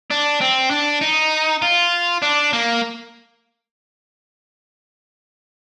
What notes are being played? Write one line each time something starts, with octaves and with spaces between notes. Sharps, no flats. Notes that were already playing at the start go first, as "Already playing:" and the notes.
D4
C4
D4
D#4
F4
D4
A#3